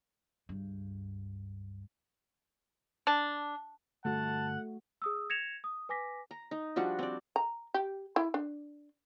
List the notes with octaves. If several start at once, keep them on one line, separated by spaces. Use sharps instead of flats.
C#2 G2
D4
G1 A3 F#4 F#5 A5
G#4 D#6 E6
G#6 A#6 C#7 E7 F7
D#6
B4 G#5 D6 A#6 B6
A#5
D#4
F3 G3 D4 F#4
C4 D5
A#5
G4
E4
D4